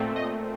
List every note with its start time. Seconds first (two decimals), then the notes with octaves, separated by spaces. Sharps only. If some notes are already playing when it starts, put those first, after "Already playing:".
Already playing: A#2 A3 C4
0.16 D#5